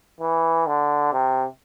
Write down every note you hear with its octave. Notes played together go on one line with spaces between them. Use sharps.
E3
D3
C3